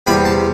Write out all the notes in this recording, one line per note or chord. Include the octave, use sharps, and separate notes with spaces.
E2 C3 G3 B5
A5